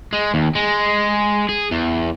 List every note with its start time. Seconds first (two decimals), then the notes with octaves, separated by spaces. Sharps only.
0.13 G#3
0.34 D#2
0.55 G#3
1.49 G#4
1.71 E2